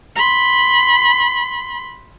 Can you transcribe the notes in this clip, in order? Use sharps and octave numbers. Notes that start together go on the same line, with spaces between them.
B5 C6